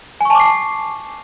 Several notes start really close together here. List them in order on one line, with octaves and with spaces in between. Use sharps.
G#5 C#6 A5 D6 C7